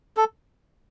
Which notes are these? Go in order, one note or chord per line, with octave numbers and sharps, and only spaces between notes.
A4